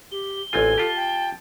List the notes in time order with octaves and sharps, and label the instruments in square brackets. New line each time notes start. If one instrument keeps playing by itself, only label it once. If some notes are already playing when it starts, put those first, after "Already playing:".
[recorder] G4 [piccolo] G7
[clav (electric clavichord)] A1 C4 F4 [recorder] A4 [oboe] G#5
[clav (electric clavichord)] F4 G4 [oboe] A5
[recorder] G5